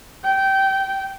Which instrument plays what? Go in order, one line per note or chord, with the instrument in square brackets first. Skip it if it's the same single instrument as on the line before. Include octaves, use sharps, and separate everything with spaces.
[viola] G5